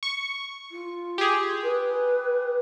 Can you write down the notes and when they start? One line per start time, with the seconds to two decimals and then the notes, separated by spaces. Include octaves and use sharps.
0.03 C#6
0.71 F4
1.18 G4 G#4
1.62 B4